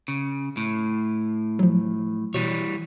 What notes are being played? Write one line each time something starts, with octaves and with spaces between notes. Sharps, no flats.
C#3
A2
F3 F#3
B2 E3 G3 C#5